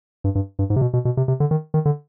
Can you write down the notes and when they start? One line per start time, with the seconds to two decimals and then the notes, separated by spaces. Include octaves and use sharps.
0.24 G2
0.35 G2
0.59 G2
0.70 G#2
0.76 C3
0.81 B2
0.94 B2
1.05 B2
1.17 C3
1.28 C3
1.40 D3
1.51 D#3
1.74 D#3
1.85 D3